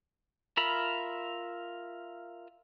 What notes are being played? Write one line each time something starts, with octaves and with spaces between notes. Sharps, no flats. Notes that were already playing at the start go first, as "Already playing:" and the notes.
F4 A#4 E5 B5